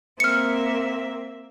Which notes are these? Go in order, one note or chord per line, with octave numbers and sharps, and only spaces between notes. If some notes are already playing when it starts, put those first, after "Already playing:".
A#3 C4 E5 F6 C#7